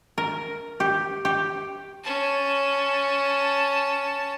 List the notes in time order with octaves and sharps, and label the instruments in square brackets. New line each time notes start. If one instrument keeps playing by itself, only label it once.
[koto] A#4
G4
G4
[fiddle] C#4 A5